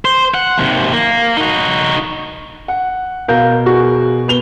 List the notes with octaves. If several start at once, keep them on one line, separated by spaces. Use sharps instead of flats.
C5
F#5
D#2 C3
A#3
D#4 F#4
F#5
B2 A#4 F5 G6
F#4 G#4
B3 F7 G7